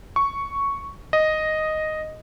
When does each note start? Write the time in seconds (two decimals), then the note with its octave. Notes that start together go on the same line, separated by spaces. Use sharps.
0.16 C#6
1.13 D#5